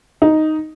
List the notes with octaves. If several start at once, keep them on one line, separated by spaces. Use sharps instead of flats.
D#4